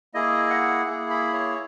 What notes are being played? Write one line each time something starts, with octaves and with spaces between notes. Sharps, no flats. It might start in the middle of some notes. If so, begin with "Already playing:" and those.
A#3 E4 G#4 D#5
F#5
A#3 E4 G#4
B5
C#5